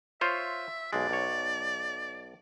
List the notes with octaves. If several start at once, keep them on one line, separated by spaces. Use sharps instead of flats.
F4 C5 C#5 E5
B1 G#3 D5
B1 C#5